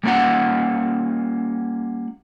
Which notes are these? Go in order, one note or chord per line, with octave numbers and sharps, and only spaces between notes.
G3 A#3 C#4 F4 F#5